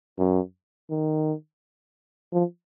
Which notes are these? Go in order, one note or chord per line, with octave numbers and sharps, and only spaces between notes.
F#2
D#3
F3